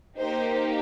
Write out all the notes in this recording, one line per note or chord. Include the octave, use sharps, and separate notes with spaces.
A#3 D#4 G4 C5